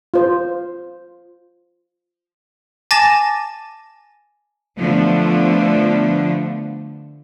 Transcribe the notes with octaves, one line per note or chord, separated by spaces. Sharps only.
F4 C5
G#5 A5 D6 A6 A#6 E7
D3 F3 A3 B3 D4